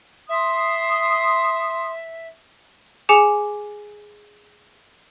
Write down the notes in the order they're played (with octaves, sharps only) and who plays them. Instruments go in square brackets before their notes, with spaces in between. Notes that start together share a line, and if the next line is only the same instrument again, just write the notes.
[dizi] E5 [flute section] C6 D#6
[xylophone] G#4 G#5 D6 C#7 E7 F7